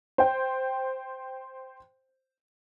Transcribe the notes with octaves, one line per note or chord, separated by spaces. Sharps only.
C5 G5